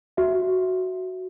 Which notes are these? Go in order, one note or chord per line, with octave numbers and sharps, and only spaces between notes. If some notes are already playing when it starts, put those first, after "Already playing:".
F#4 E5